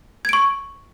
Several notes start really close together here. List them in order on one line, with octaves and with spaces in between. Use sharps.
G#6 D7 C#6